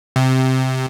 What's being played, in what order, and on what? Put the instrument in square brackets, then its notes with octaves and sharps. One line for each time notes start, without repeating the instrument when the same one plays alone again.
[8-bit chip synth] C3